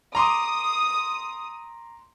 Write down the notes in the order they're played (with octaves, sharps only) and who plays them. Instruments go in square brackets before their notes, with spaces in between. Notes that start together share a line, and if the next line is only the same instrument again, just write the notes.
[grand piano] A#5 C6 D6 [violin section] D#6